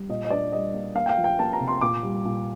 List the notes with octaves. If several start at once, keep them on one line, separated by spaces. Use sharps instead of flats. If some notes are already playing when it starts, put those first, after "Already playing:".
Already playing: G3
A#2 D#5
D#5
D4 D5
G3 D#5
A#3
A#3 F5
G5
F5
F3
G5
A#3 A5
A#5
C3
C6
A#2 D6
G3
A#2